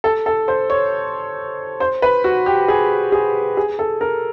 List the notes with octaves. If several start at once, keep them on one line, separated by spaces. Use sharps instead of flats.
A4
A4
C5
C#5
C5
B4
F#4
G4
G#4
G#4
G#4
A4
A#4